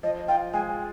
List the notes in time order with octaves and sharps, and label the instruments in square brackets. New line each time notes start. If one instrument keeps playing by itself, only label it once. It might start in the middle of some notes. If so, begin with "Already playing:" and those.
[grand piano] F3 [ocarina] D#5
[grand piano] F4 [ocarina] G5
[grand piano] G#3 [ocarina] G#5